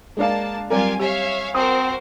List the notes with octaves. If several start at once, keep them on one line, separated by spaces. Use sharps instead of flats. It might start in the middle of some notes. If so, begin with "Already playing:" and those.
G#3 A#3 D4 F5 A5
F#3 G3 C4 F4 G4 A#4 D5 G#5
G4 C#5 E5 F5 G#5
C4 F#4 A#4 C5 G#5 D#6